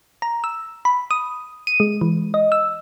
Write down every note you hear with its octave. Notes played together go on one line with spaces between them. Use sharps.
A#5
E6
B5
D#6
D#7
G#3
E3
D#5
E6